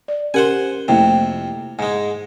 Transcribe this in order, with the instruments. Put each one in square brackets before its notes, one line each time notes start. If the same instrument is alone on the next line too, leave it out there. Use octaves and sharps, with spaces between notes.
[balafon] D5
[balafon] C#4 G4 A#4 [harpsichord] C5 F#5 G#5
[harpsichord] F2 C3 [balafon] A3 A#3 E4
[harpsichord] G#2 G#3 [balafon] G#5